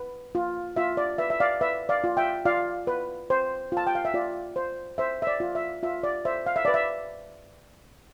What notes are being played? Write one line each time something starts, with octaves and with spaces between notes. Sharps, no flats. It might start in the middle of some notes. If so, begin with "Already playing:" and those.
Already playing: B4
F4
F4 E5
D5
B4 E5
E5
D5 F5
B4 E5
D5 F5
F4
E5 G5
F4 D5 F5
B4
C5
F4 A5
G5
F5
E5
F4 D5
C5
C5 E5
E5
D5
F4
E5
F4 E5
D5
C5 E5
F5
E5
B4 D5
E5